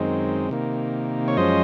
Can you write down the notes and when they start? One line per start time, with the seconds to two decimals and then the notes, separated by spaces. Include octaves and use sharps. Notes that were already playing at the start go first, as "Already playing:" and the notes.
Already playing: F#2 D#3 G#3 C4
0.49 C3 D#3 A#3
1.28 C#5
1.37 F#2 F3 G#3 C#4 C5 D#5